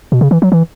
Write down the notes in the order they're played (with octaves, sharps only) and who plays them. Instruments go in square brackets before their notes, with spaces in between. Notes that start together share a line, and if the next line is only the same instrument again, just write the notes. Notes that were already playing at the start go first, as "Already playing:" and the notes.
[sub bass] B2
C#3
E3
F#3
E3